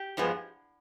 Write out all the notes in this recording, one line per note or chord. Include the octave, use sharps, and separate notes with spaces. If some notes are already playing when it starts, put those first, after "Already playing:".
Already playing: G4
G2 F3 G#3 B3